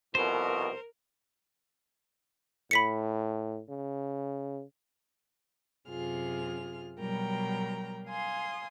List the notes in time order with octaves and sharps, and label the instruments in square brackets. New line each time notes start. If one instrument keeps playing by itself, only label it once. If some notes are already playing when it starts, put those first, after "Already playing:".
[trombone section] C2 F2 B2 [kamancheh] A#4 [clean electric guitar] C5
[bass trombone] A2 [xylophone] B5 B6 C#7
[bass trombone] C#3
[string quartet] F#2 C3 F4 G#4 F6
B2 F#3 G3 A#4 G5 A#5
F5 G#5 C6 D#6